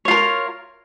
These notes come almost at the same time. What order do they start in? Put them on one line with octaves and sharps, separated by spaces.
C#5 F4 A#4